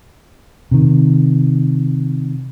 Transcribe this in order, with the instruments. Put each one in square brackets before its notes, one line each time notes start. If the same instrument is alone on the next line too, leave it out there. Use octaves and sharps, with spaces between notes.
[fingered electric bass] C3 D#3